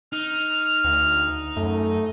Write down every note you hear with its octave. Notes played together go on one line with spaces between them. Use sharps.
D#4 F6
D2
F#2 A3